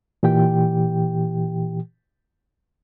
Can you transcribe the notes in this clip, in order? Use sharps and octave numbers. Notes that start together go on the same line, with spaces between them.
A#2 E3 G4 G5